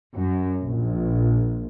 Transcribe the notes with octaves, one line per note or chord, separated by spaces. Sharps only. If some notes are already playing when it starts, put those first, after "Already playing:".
F#2
A#1